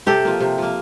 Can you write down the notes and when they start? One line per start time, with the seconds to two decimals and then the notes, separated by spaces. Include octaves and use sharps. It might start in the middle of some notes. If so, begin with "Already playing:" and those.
0.06 C3 G4 A4
0.25 F3 A#3
0.40 C3
0.58 F3 A#3